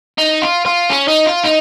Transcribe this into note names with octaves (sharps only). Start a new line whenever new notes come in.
D#4
F4
F4
C#4
D#4
F4
D#4